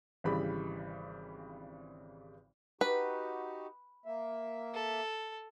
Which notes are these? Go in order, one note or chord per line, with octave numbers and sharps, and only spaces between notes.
G#1 C#3 E3 G3 B5
D#4 F#4 G4 B4
A#3 E5
A4